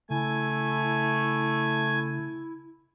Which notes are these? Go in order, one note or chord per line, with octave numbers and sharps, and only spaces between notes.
C#3 A3 E4 G#5